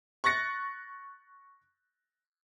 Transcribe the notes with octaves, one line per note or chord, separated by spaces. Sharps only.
C#6 F#6 A6 A#6 C#7